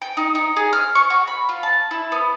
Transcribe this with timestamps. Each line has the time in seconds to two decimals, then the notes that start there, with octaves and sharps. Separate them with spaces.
0.02 G5
0.17 D#4
0.35 D#4
0.57 G#4
0.73 F6
0.95 C#6
1.10 F#4
1.28 B5
1.49 F4
1.63 A5
1.91 E4
2.12 B3